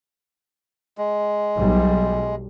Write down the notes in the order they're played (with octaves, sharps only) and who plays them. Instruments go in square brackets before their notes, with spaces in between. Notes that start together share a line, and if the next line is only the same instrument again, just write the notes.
[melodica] G#3
[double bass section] B1 G3